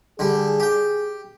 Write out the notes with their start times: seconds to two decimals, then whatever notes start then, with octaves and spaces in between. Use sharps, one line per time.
0.19 D3 G3 G#4
0.60 G4 G5